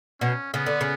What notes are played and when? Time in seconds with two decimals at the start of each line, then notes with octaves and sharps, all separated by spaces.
0.21 B2 C#4
0.54 C#3 B3
0.66 D3
0.81 C#3